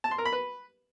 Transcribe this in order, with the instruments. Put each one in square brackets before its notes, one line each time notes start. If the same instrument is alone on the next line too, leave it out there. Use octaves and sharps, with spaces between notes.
[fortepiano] A5
C6
A#4
B5
B4